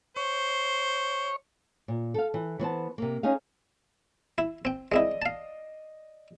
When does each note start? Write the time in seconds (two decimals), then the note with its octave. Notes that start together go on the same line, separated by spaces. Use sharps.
0.16 C5 C#5
1.88 A#2
2.14 A4 F5
2.34 E3
2.59 E3 B3 C5 A5
2.98 C3 A#3
3.23 C#4 D#4 G#4 F5
4.38 E4
4.65 C4 G5
4.92 G#3 C4 E4 D5 D#5
5.22 F5 A5